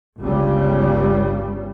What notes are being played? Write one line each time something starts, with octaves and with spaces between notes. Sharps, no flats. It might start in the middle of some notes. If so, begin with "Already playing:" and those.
G1 C#2 C#3 G3